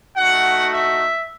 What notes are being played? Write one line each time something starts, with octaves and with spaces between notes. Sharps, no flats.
A3 D#4 F#4 F#5
E5